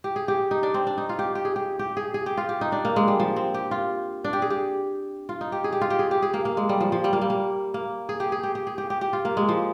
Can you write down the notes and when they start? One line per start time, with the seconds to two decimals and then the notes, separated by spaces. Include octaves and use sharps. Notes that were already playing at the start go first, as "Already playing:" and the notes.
0.04 G4
0.16 G#4
0.28 G4
0.51 D#4
0.63 D4
0.74 C4
0.87 D4
0.98 D#4
1.09 F4
1.19 G4
1.35 G4
1.45 G#4
1.56 G4
1.79 G4
1.97 G#4
2.14 G#4
2.26 G4
2.37 F4
2.49 G4
2.61 D#4
2.72 D4
2.85 A#3
2.96 G#3
3.08 G3
3.20 F3
3.36 C4
3.54 G4
3.71 F4
4.24 D4
4.33 G4
4.42 G#4
4.50 G4
5.29 F4
5.41 D#4
5.52 G4
5.64 G#4
5.72 G4
5.81 F4
5.90 G4
5.99 G#4
6.11 G4
6.22 G#4
6.34 A#3
6.45 A#3
6.57 G#3
6.69 G3
6.81 F3
6.92 F3
7.04 G3
7.13 A#3
7.22 G3
7.30 A#3
7.74 A#3
8.09 G#4
8.20 G4
8.32 G#4
8.43 G4
8.55 G4
8.67 G#4
8.78 G4
8.90 G4
9.01 G4
9.13 F4
9.25 A#3
9.37 G#3
9.49 F3